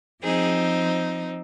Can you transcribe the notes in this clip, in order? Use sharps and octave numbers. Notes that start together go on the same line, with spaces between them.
F3 C4 D#4 G#4